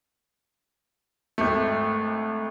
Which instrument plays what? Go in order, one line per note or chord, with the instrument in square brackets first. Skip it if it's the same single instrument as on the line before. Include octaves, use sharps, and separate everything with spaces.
[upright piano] G#1 A3